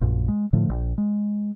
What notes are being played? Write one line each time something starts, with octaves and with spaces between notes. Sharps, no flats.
A#1 F#2 A#2
G#3
A2 D3 F3 A3
A#1
G#3